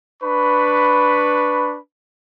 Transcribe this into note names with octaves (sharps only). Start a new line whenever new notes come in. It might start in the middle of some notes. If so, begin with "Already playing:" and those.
D4 B4 B5 C#6